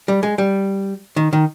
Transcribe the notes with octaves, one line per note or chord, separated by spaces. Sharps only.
G3
G#3
G3
D#3
D#3